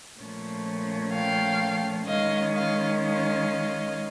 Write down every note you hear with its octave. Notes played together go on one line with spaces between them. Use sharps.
A#2 F3 A3 C#4
F5 G5
D#3 G#3 C#4 D#5 F5
D#5 F5
D#5 F5